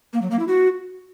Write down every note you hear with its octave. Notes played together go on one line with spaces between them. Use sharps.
A#3
F#3
A#3
E4
F#4